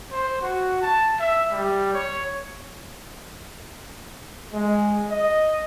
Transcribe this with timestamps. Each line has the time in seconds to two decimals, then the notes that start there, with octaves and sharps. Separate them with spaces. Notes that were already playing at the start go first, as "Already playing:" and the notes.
0.11 C5
0.41 F#4
0.82 A5
1.20 E5
1.51 G3
1.94 C#5
4.53 G#3
5.10 D#5